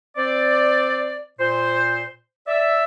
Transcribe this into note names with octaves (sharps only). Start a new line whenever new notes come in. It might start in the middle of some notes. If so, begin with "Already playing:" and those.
C4 C5 D5
A#2 C5
D5 E5